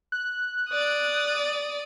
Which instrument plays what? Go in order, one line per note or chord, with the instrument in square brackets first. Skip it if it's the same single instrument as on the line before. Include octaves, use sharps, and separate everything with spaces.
[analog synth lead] F#6
[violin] D5 D#6